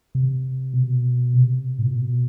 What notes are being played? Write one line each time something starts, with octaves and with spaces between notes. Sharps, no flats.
C3
B2
C3
A2
A#2
B2